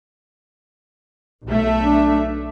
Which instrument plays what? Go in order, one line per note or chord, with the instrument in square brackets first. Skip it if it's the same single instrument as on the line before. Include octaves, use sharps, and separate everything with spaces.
[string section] B1 A3 E5
[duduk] D4